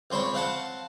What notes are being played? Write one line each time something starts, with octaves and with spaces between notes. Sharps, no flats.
C#2 C4 C5 C#5 B5
C4 F5 F#5 A5